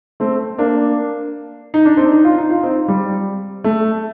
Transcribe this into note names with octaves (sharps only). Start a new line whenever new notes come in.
A3 C4
A#3 D4
D#4
D4
C4 D#4
D#4
F4
D#4
F4
C4 D#4
G3
A3